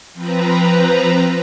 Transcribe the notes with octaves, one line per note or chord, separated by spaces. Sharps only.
F3 C4 B4 A#5